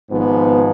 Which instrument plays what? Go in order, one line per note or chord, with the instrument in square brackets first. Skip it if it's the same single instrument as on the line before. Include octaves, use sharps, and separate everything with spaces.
[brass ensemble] G#1 G#2 F3 B3